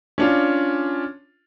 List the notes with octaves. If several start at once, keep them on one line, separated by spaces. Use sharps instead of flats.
C#4 D4 F4